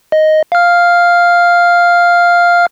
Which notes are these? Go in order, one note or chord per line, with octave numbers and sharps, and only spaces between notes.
D#5
F5 F6